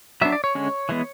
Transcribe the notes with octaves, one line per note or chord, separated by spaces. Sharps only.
F#3 B3 D4 E5
D5
C#5
D3 G#3 C#4
E3 G#3 B3